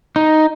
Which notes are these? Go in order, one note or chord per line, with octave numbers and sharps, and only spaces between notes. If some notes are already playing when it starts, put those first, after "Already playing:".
D#4